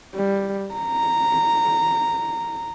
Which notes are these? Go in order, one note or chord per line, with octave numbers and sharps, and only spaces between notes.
G3
A#5